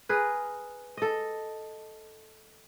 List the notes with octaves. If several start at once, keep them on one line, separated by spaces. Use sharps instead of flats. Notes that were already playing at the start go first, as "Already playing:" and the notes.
G#4 A#4 B4
A4 D#5